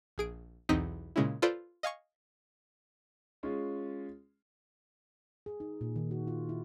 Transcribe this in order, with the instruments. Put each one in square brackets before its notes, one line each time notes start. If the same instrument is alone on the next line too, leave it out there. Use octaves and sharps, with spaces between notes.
[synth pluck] A#1 G#4 D7
B1 E2 C4 D#4 D#5 B6
A#2 C#3 G#3 C#4 E4
F4 A4 B4 C5 D5 D6
D#5 F5 G#5 C#6
[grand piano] G#3 C#4 F4
[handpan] G#4
D#4
A#2
D#3
F#4
F4
E4